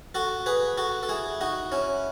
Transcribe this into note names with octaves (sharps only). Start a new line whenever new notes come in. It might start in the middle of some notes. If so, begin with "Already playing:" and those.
F#4 A4
G#4 B4
F#4 A4
A4
E4 G#4
D#4 F#4
C#4 E4